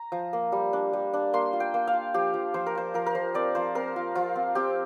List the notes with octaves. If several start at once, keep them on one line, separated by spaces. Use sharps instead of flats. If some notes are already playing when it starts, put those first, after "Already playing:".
Already playing: A#5
F3
A#3
G3
D4
G3
D4
A#3 C6
F4
G5
A#3
F5
F4
F3 G4
F3
F3 C5
A#4
F4 C5
F3 A#4
A#4
F3 C5
C4 D5
F3 C5
C4 A#4
F4
F3 F4
C4
C4 G4